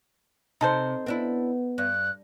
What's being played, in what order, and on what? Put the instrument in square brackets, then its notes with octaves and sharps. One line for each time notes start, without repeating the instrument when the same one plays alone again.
[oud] C3 [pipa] D#4 A4 C5
[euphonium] B3 [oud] C4 D4 E4
[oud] G2 [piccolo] F#6